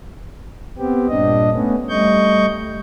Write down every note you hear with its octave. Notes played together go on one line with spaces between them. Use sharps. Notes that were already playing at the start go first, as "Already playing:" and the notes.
B3 C4 G4
G2 A#2 D4 D#5
A3 B3 C#4
G3 A3 D#5 C#6 G6